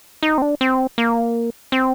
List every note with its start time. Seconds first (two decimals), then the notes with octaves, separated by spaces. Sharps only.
0.23 D#4
0.38 C4
0.42 D4
0.61 C4
0.98 A#3
1.72 C4